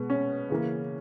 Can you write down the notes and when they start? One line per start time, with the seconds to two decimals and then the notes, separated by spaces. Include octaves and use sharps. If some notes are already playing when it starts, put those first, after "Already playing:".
Already playing: B2 G#3 B3
0.10 C#4
0.50 C#3 E3 A#3